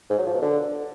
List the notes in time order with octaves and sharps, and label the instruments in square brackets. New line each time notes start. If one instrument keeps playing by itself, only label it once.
[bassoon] G#2
F#3
F3
B2
D3